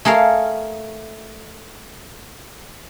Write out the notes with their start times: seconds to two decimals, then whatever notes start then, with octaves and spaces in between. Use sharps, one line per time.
0.05 A3 G#4 A#4 F5